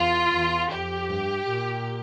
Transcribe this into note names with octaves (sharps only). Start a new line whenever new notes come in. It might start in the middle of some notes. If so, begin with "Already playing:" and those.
Already playing: E2 F4
E2
F2 G4
G2
A#2